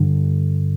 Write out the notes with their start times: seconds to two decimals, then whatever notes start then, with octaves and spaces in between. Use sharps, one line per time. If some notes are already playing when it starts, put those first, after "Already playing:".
Already playing: G2 D3